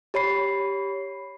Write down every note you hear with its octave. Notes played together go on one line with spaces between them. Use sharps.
G4 C#5 B5 C7